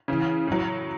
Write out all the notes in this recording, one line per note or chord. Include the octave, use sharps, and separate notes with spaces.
C#3 E3
A2 F#3